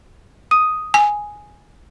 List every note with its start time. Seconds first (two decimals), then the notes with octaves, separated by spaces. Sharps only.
0.51 D#6 D#7
0.94 G#5